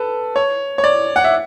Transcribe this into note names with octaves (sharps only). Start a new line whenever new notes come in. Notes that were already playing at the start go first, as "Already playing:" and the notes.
Already playing: A4 B4
C#5
C#5
D5
F#5
E5